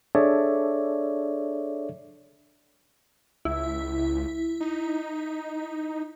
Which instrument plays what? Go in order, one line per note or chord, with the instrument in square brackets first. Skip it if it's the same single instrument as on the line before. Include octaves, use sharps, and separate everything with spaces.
[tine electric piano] D4 G#4 A4 C#5 D5 E5
[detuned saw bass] C#2 [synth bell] E4
[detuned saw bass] D#4